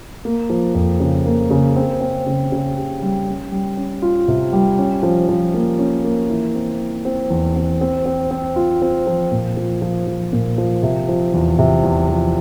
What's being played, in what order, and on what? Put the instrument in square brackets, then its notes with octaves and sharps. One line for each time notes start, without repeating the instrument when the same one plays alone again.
[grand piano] A#3
F3
F2
C#3
A#3
C#3
C4
C4
C#3
C#3
G4
G3
C#4
G3
C#4
F4
C3
G3
C#4
F3
F3
A#3
C#4
A#3
E3
C4
E3
C4
E2
C4
C4
C4
C4
F4
C4
F3
A#2
F3
F3
F3
A#2
F3
C3
F3
E2
C3
E2
F3